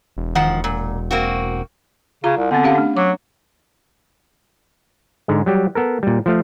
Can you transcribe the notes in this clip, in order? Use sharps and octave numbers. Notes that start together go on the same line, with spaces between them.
E1
D#3 F3 F#5
A#2
A#3 C4 F#4
C#3 F4 A#5
C2
D3 B3 C4
C#4 G4 F5
A3 D4
F#3 D6
G#2 D3 G#3
F#3 G3 G4
B3 A4 A#4
A#2 G3
F3 A3 F5